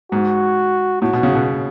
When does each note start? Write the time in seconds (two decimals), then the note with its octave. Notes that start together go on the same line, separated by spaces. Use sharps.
0.12 G#2 F#4
1.01 A2 F#4
1.13 B2
1.23 C#3
1.35 B2